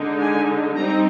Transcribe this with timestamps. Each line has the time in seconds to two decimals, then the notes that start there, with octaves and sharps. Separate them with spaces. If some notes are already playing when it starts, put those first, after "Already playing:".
Already playing: D3 G#3 D#4
0.21 G#5
0.75 G3 C4 D#4 A#5